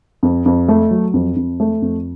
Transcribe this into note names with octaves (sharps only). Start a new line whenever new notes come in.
F2
F2
A3
F#3
F2
F2
A3
F2